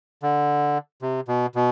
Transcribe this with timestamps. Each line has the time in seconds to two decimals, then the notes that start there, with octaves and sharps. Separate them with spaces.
0.23 D3
1.02 C3
1.28 B2
1.55 B2